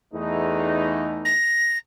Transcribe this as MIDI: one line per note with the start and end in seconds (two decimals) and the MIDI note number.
0.14 1.33 40
0.14 1.33 57
0.14 1.33 63
1.25 1.78 94